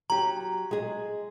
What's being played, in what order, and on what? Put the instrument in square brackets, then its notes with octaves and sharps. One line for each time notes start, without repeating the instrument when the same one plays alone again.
[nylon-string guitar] F#3 G4 [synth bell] A#5
[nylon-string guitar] G#3 G#4